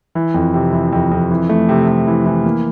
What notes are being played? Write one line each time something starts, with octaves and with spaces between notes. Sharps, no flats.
E3
F2
C3
E3
F2
F2
E3
A3
C3
C3
E3
E3
A#3